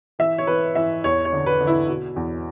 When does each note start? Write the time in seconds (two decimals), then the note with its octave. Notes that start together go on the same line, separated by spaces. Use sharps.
0.19 E3 E5
0.38 C#5
0.47 E3 B4
0.75 E3 E5
1.04 E2 C#5
1.25 C#5
1.32 D3
1.46 B4
1.61 D3
1.67 E4
1.88 B2
2.16 E2